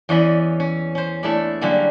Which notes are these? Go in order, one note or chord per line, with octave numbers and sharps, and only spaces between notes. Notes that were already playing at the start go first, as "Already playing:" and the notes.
E2 E3 C#4 D5 D#5 B5
C#4
C#4 C5
A3 D4 E4 G#4 A4 D5
D3 F#3 G3 A#3 C#4 G#4